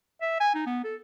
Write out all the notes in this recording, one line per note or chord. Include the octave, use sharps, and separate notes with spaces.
E5
G#5
D#4
B3
A4